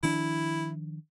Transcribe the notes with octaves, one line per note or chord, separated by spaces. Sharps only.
D#3 F3 D4 E4